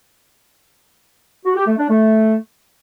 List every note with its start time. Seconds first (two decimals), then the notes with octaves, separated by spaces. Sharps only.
1.45 F#4
1.56 G4
1.67 A3
1.78 D4
1.89 A3